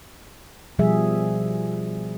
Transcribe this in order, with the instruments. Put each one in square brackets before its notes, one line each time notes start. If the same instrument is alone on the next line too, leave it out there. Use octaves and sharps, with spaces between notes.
[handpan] B2 F3 G3 G#4 E5